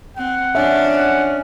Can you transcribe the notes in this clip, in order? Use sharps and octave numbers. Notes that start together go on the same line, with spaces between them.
C4 F#5
F3 C#4 D4 E5
F#5